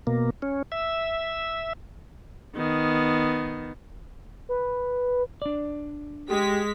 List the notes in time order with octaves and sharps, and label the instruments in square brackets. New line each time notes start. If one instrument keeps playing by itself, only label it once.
[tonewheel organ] B2 A#3
C#4
E5
[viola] D#3 B3
[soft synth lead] B4
[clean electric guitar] D4 D5
[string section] G#3 B6 [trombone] G4